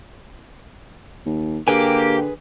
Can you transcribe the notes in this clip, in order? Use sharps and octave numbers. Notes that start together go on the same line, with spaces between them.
D#2
D3 A#3 G4 G#4 B4 G#5